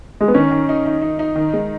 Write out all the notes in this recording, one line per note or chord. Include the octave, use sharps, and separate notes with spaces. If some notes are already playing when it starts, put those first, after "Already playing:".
G#3
B3
D#3 C#4
D#3
D#4
D#4
D#4
D#4
D#3
G#3